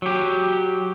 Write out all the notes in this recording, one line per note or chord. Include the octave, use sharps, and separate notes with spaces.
F#3 G4